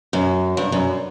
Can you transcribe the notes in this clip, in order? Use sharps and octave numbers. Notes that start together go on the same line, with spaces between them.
F#2
G2
F#2